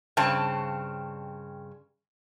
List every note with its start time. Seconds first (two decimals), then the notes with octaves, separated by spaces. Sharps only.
0.17 G2 C#3 C4 A5